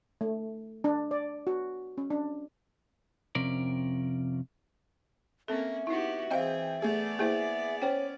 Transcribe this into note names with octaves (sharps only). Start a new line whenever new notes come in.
A3
D4
D5
F#4
C#4
D4
F2 C3 C#4 A#4 D5
A#3 C4 C#4 A4 E5
B3 D#4 E4 F#4 G4
E3 C4 G#4 D#5 F5 G5
A3 B3 G#4 D5
A#3 E4 G#4 C5 E5
C#4 C5 C#5 G5